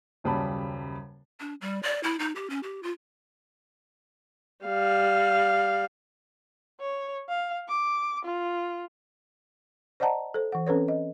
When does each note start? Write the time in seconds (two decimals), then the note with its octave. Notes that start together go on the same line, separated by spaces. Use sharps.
0.24 D#1 F#2 C#3 G3 A5 B5
1.40 D4
1.61 G3
1.83 D5
2.03 E4
2.19 D#4
2.36 G4
2.50 C#4
2.63 G4
2.83 F4
4.65 G3 F5
6.80 C#5
7.29 F5
7.68 D6
8.25 F4
10.00 C5 D5 D#5 F#5 A5 A#5
10.34 A4 C5
10.52 E3 F#5
10.67 C4 C#4 A4 B4 C#5
10.88 D#5